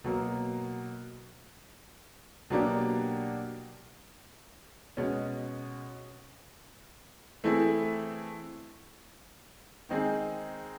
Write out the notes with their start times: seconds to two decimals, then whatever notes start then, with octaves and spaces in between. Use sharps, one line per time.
0.04 B2 F#3 A#3
2.50 B2 F#3 A#3 D4 G4
4.97 B2 G#3 C#4
7.44 E3 A3 C4 E4 G#4
9.89 D#3 G#3 C4 D#4 G#4